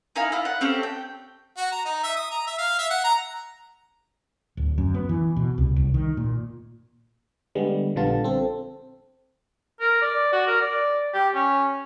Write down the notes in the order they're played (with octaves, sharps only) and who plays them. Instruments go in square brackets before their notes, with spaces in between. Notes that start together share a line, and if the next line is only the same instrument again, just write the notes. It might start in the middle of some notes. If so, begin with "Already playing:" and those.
[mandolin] D#4 E4 F5 G#5
E4 F4
F#5
C4 C#4 G4 A4
G5
[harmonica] F#4
A#5
D#4
E5
D#6
A#5
E5
F5
E5
F#5
A#5
[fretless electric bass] D1
F#2
B3
E3
B2
C2
C2
D#3
A#2
[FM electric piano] D3 G3 G#3 B3
A#1 D3 G3 B3 F4 A5
C4 A4
[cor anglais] A#4
D5
F#4
A#4
D5
G4
C#4